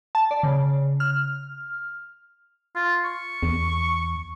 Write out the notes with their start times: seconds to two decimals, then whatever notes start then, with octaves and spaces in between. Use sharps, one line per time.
0.15 A5
0.31 D5
0.43 C#3
1.00 F6
2.76 F4
3.04 C#6
3.43 E2